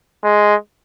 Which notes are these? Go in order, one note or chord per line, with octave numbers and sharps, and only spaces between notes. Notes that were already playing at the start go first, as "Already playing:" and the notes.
G#3